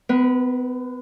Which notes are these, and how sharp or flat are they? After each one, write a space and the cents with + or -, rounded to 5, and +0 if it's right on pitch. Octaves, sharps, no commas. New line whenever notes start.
B3 +35 B4 -25